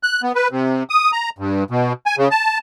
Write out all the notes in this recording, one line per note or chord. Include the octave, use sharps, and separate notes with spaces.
F#6
B3
B4
C3
D#6
A#5
G2
B2
G#5
C#3
A5